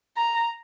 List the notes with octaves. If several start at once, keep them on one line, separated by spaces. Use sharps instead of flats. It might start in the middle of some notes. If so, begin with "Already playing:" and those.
A#5